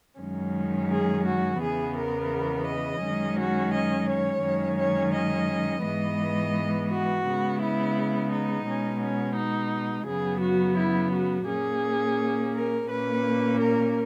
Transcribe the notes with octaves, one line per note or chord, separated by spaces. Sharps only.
F#2 D#3 G#3 C#4
G#4
F#4
E2 C#3 E3 B3 G#4
A#4
D#5
F#2 D#3 G#3 C#4
F#4
D#5
C#5
F#2 D#3 G#3 C#4
C#5
D#5
G#2 E3 G#3 B3 D#5
F#4
C#3 G#3 B3
E4
D#4
B2 G#3 C#4
C#4
D#4
F#2 C#3 F#3 B3 G#4
F#4
E4
F#4
A#2 A#3 C#4 G#4
A#4
A#2 A#3 C#4 B4
A#4